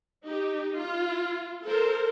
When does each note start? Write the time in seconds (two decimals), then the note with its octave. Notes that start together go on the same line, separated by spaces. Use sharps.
0.24 D#4 G4
0.78 F4
1.64 A4 A#4 C5